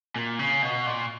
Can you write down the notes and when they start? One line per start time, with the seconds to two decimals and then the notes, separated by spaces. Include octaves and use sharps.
0.16 A#2
0.39 C#3
0.62 B2
0.86 A#2